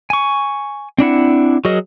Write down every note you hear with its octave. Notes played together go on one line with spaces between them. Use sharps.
G#5 C#6
C4 D4 E4 F#5
F#3 F#4 G#4 A#4 D#5